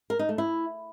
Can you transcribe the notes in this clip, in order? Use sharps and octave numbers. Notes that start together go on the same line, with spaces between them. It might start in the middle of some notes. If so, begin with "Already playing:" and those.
A#4
D#4
A3
E4